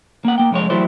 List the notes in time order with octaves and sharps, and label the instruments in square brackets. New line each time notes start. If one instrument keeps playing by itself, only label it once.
[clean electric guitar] A#3 F#5
A#3 G5
C2 F2 G#3 C#5
E3 F#3 G3 A3 E4 C5